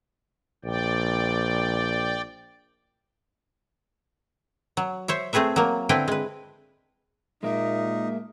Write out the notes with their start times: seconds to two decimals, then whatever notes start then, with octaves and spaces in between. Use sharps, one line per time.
0.65 A#1 D5 G5
4.77 F#3
5.08 C5 C#5 E5
5.33 A3 C4 G#4 B4 E5
5.56 F#3 A#3
5.89 D3 C4 E4 B4 G5
6.08 G#3 B4
7.43 A#2 G#3 A#3 D#4 E5